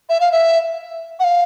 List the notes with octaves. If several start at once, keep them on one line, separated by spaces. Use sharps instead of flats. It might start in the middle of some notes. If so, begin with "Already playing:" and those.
E5
F5
E5
F#5
F5